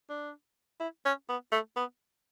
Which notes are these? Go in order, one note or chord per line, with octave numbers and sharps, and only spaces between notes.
D4
E4
C#4
B3
A3
B3